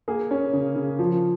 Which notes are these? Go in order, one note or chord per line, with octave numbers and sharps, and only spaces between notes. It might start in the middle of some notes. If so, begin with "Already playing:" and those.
A#3 G#4
C#4
C#3
C#3
F3